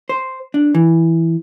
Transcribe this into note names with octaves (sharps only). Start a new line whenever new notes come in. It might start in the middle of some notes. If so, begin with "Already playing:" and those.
C5
D4
E3